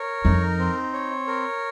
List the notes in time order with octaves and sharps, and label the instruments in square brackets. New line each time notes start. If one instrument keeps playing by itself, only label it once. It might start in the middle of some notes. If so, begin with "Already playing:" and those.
Already playing: [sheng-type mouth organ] A#4 C#5
[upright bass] F2 [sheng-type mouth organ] D#4
[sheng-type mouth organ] C4
C#5
A#4